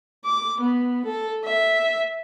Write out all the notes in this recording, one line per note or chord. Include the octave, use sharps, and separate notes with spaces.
D6
B3
A4
E5